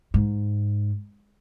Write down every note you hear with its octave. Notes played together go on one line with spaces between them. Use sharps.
G#2